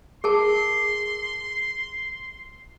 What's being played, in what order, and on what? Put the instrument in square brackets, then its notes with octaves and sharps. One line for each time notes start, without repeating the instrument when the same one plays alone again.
[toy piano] G#4 A#4 A5 [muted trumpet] C6